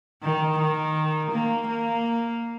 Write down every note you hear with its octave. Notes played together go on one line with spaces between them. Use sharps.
D#3
D#3
A#3
A#3